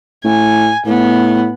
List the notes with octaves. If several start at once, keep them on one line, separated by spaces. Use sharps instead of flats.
A2 G#5
A2 B3